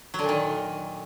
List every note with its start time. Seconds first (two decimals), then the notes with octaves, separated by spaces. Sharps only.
0.14 F#3
0.19 D3
0.24 A#2
0.29 D#3